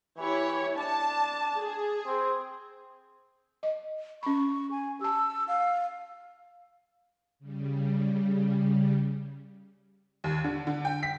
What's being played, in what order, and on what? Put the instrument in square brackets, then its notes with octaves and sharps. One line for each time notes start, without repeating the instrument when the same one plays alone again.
[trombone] E3 [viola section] E4 G4 C#5
[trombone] D4 [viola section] A5
[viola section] G#4
[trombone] C4
[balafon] D#5
[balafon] C#4 B5 [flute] C#6
[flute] G#5
[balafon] G4 A5 [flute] E6
[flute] F5
[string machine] C#3 G3
[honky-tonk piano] D#2
D3
D3
G5
B6